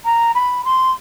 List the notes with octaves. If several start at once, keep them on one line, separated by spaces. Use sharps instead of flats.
A#5
B5
C6